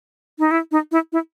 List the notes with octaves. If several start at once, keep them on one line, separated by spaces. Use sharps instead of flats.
D#4
E4
D#4
E4
E4